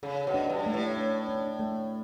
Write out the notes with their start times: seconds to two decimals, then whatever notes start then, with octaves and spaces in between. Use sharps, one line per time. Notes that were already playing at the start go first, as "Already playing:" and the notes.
0.03 C#3 A4
0.27 B2
0.34 D4
0.50 G2
0.66 A3
0.73 A2
0.97 D4
1.29 D4
1.60 A3